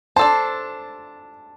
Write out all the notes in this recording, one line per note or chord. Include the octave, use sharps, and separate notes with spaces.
D4 A4 C5 A5